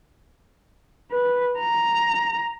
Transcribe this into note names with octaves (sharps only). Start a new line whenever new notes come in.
B4
A#5